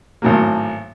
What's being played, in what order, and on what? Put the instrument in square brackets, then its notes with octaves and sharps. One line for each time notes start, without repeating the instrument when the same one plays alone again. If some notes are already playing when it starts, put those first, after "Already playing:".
[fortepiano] G#1 A2 F#3 A#3